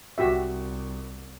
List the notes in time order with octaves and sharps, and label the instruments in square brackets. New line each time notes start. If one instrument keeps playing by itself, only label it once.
[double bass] C2 [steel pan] F#4 G4 E5